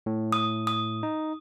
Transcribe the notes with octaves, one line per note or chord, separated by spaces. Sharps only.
A2
D#6
D#6
D#4